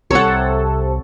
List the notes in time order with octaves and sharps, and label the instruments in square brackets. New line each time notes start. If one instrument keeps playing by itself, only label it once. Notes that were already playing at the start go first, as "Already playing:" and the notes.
[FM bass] C2 [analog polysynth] C3 A4 [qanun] C#5 F#5